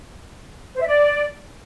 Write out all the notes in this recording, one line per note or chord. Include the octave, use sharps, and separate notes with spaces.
C5
E5
D5